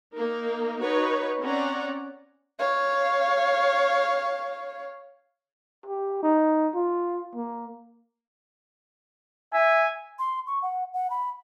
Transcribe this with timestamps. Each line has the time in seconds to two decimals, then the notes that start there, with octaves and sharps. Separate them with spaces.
0.14 A#3 D#4 A#4
0.83 D#4 F#4 B4 C#5
1.41 C4 C#4 C#5 D5 F#5 A#5
2.59 C#5 F5
5.86 G4
6.23 D#4
6.75 F4
7.35 A#3
9.53 E5 G#5
10.19 C6
10.47 C#6
10.62 F#5
10.94 F#5
11.10 B5